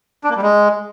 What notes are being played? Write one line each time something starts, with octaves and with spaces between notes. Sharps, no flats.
D4
A#3
G3
G#3